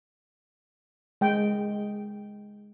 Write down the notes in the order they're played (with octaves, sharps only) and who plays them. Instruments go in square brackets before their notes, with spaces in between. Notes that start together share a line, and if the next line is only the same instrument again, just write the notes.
[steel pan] G#3 G5